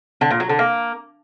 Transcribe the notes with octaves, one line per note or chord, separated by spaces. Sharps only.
D3
A#2
F#3
D3
A#3